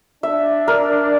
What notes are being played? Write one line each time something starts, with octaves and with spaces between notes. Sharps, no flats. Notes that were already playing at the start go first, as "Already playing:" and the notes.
D4 E5
A#4